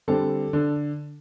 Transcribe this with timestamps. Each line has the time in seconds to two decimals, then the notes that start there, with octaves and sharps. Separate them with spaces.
0.08 D3 G3 C4 A4
0.53 D3